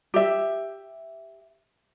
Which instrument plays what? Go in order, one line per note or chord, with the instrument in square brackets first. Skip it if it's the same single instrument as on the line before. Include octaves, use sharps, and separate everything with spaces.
[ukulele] G4 E5